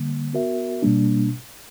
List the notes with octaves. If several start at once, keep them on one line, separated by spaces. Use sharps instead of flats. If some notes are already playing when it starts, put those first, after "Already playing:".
Already playing: D3 G3 A#3
B3 F#4 A#4 E5
B2 G3 A#3 D4